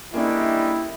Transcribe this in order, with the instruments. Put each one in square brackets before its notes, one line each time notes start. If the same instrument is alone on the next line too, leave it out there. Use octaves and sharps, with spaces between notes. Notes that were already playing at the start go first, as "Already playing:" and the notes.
[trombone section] D3 G3 G#3 [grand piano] A#3 C#4 D4 [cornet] E4